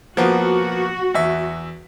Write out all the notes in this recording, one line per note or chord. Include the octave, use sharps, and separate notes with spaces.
F3 A#3 B3 F#4
E2 E5